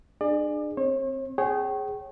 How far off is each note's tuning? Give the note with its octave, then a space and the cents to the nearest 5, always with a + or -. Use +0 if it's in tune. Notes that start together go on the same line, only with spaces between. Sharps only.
D4 +35 G#4 -5 D5 +35
C4 +10 C#5 -45
G#4 +0 C#5 -20 G5 -35